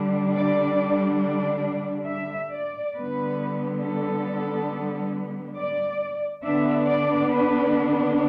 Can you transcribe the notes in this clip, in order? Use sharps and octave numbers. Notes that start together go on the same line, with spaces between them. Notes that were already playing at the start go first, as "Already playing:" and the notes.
Already playing: D3 G3 D4
D5
D5
E5
D5
D3 G3 B3 B4
A4
D5
D3 B3 D4 E5
D5
B4